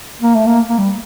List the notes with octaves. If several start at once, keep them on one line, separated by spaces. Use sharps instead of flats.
A#3
A3
A#3
A#3
G3